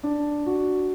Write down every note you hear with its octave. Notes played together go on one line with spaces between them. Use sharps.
D4
F#4